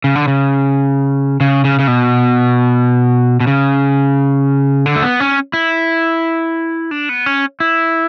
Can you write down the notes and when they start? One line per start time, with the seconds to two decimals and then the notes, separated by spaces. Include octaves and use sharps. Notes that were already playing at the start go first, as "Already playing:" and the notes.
0.04 C#3
0.15 D3
0.28 C#3
1.41 C#3
1.65 C#3
1.79 C#3
1.88 B2
3.40 B2
3.47 C#3
4.86 D3
4.96 A3
5.02 B3
5.20 C#4
5.53 E4
6.91 D4
7.09 B3
7.26 C#4
7.60 E4